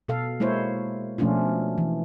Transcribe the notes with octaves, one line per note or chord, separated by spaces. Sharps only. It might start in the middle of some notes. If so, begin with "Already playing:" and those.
B2 A4 F5
G#3 A#3 E4 C5 C#5
B2 F3 A3 C#4 D4 F4
E3